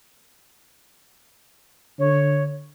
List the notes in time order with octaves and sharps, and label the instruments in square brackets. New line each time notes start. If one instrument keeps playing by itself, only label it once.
[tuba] D3 [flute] C#5